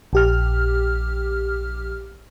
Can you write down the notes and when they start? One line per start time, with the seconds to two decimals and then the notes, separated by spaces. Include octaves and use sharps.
0.13 A#1 G4 F6